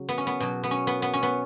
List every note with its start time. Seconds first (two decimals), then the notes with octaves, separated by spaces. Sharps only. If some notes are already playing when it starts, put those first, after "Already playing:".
Already playing: C#3 F#3
0.09 B3
0.18 C#4
0.27 B3
0.40 B2 F#3
0.64 B3
0.71 C#4
0.87 B3
1.02 B3
1.13 C#4
1.23 B3